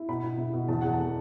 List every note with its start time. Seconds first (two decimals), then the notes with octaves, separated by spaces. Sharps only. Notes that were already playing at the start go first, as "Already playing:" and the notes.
Already playing: E4
0.09 B2 B5
0.23 B2
0.38 E4
0.53 B2
0.68 E2 A5
0.81 E2 F#5
0.93 A5
0.99 A3